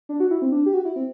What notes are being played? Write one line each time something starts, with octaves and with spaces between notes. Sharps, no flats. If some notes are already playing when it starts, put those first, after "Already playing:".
D4
F#4
E4
C4
D4
G4
F#4
E4
C4